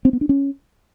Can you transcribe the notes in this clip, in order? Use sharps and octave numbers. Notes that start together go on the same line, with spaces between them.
C4
B3
D4
C#4